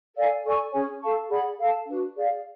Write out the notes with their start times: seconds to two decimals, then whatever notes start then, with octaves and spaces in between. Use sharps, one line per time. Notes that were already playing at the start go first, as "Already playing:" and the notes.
0.14 A4 D5 F5 G#5
0.43 A4 D5 G#5 C#6
0.72 C#4 G#4 C#5 G#5
1.00 A4 F5 A5 C#6
1.30 G#4 D5 F#5 B5
1.58 A4 F5 A5
1.86 D4 F#4 B4
2.15 G#4 D5 F5